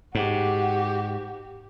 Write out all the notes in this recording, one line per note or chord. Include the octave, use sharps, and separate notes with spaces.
G#2 F#4 G4